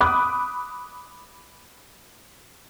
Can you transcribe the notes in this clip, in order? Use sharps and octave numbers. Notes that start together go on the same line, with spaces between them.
B5 D6 D#6 F#6